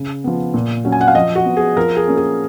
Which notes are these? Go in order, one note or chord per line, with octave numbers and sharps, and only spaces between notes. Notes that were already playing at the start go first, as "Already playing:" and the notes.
Already playing: C#3
F3 B3
A#2
F#3 C#4
G#5
F#5
F5
F3 D#5
F#4
B3
G#4
F3 A#4
G#4
A#3 C#4
G#4